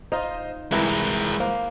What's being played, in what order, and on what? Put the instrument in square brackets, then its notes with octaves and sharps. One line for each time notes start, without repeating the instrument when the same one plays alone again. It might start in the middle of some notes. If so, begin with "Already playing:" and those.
[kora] D#4 F4 [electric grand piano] C5 D#5
[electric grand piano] C2 B5 A#6 [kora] E3 [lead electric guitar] G#3 A#4
[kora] A#3 [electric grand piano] C5